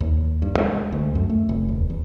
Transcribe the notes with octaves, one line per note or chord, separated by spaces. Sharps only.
D#2
G2
G#3
D2
F#2
A3
F1
D#1
E2